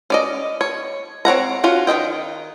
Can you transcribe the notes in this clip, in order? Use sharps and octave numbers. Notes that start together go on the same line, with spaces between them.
C#4 D5 D#5
C#5
C4 C#5 F#5 A#5
C#4 F4 F#4
D#3 D#4 D#5 G5